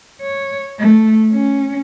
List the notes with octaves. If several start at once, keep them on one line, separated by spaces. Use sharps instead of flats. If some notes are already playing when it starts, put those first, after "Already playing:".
C#5
A3
C#4